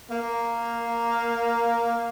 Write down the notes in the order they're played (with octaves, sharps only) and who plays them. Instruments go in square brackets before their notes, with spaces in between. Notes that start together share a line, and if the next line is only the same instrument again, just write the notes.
[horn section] A#3